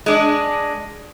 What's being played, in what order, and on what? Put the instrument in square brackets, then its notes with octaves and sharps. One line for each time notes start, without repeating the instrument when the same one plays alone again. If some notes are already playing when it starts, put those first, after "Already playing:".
[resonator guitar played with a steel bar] G#3 D4